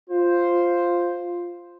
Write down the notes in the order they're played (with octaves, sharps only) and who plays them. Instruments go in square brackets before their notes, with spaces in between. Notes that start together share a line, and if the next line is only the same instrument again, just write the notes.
[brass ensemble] F4 C5